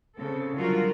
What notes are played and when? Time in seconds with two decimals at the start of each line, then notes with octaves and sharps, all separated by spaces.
0.16 C#3 C4 A4
0.56 D3 F#3 G3 F4 F#4 A#4